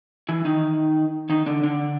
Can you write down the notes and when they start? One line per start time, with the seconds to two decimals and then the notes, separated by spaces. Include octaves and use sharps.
0.29 E3 E4
0.45 D#3 D#4
1.30 D#3 D#4
1.46 D3 D4
1.63 D3 D4